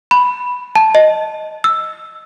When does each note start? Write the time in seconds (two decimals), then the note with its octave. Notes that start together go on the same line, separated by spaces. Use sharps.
0.11 B5
0.76 A5
0.95 D#5
1.64 E6